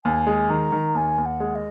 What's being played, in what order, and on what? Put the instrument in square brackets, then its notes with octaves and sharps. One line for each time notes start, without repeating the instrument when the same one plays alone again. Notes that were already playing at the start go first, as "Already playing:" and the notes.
[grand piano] D#2 [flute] G#5
[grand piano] G#3
[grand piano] D#3 [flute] A#5
[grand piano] D#3
[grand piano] D#2 [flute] G#5
[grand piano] D#2
[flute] F#5
[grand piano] G#3
[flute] D#5